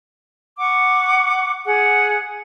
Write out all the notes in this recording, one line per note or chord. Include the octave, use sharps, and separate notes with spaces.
F#5 C#6 D6
G#4 F#5